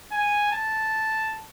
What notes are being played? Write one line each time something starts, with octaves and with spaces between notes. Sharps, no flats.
G#5
A5